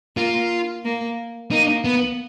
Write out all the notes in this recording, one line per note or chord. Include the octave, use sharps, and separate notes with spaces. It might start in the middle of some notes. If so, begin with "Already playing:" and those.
A#3 F4
A#3
A#3 D#4
B3